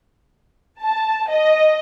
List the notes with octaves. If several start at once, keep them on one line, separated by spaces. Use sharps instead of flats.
A5
D#5